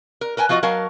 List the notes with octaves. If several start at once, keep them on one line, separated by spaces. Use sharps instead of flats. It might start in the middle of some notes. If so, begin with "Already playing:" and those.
A#4
A#4 B4 G5 G#5
F3 F4 F#4 D5 D#5
F#3 A#4 F5 A5